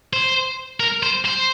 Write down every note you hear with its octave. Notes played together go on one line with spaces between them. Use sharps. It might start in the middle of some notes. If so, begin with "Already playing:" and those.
C5
A#4
C5
C5